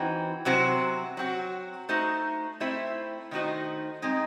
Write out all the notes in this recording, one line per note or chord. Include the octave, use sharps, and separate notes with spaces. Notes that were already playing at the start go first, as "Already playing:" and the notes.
Already playing: E3 C4 D#4 F#4
C3 F#3 C4 F#4 C5
F#3 C4 F#4
A3 D#4 F#4 C5
A3 C4 E4 C5 E5
D#3 A3 D#4 F#4 C5
G#3 C4 D#4